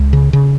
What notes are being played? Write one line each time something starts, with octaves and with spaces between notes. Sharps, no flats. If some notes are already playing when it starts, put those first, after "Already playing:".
Already playing: C#2
C#3
C#3